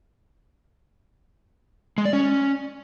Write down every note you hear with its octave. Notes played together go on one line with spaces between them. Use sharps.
G#3
D5
C#4